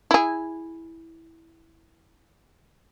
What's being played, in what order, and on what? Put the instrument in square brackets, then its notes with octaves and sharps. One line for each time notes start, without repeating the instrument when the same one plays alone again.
[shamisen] E4 G#4